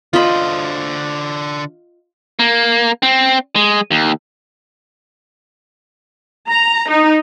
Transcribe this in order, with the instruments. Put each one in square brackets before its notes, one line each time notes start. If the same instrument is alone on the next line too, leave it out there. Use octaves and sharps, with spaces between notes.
[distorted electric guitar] D3 C5 [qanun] F4 D#5 B5
[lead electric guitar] A#3
C4
G#3
D#2
[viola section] A#5
D#4